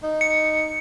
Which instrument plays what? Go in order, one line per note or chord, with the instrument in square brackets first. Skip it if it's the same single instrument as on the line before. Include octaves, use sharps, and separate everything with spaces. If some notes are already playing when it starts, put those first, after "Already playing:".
[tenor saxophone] D#4
[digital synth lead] C#7